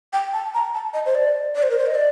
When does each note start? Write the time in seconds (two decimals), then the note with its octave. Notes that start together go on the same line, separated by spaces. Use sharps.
0.13 G5
0.33 A5
0.54 A#5
0.74 A5
0.94 D#5
1.06 C5
1.15 D5
1.55 D5
1.63 C5
1.70 A#4
1.78 C5
1.86 D#5
1.95 D5